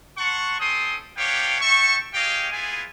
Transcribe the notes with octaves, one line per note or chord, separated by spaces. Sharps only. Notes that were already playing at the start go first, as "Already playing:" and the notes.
F#5 A5 C6 C#6
C#4 A4 G5 C6 D#6
B3 D4 G4 C#5 F5 G5
E5 G5 A5 C#6
G4 G#4 C#5 D#5 F5 G5
B3 E4 F4 G#4 G#5